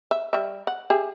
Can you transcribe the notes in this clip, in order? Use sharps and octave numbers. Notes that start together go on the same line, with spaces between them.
E5
G3 E5
F#5
G4 G#4 E5